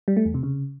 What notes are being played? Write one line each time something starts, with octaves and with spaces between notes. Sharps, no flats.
G3
A3
E2
C3
C#3